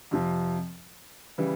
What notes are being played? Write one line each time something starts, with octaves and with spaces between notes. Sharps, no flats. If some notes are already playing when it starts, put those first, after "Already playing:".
F2 C3 F3
C#3 E3 G3